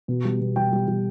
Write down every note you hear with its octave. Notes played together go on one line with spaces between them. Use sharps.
B2
G3
B2
G3 G5
G3
G3